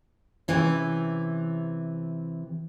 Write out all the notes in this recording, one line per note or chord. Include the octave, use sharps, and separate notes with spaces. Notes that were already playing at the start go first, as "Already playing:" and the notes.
C3 E3 C#4